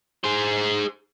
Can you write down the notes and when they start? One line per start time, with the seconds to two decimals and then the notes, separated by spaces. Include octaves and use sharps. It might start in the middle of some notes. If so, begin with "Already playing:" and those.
0.24 G#4 C5